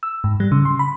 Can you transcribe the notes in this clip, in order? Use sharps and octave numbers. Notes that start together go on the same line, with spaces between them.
E6
G#2
G3
C#3
C6
B5